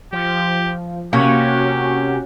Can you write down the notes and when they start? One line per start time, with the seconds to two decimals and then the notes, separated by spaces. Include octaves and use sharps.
0.12 F3 G4
1.13 C3 A#3 C#4 F#4 G4 C#5